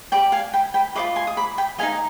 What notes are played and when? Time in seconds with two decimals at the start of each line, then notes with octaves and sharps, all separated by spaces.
0.12 G4 D5 G5 B5
0.32 F5 G#5
0.54 G5 B5
0.74 G5 B5
0.95 F4 C5 D#5 B5 D6
1.16 G#5 C6
1.27 D#6
1.37 B5 D6
1.58 G5 B5
1.78 D#4 B4 D#5 F5 G#5
1.92 D#5